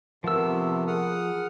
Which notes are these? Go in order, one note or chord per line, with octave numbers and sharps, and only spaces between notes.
C3 F3 A3 B3 A#4 E6
G#4 F#5 D#6 F6